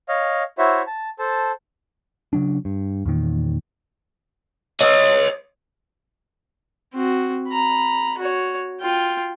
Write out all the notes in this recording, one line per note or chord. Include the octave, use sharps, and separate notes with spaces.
C#5 D#5 F5
E4 F#4 C5 C#5 E5
A5
A4 C5 A5
C#3 F#3 D4
G2
E2 A#2 D#3
C#5 D#5
C4 F#4
A#5 B5
F#4 C#5
F4 G5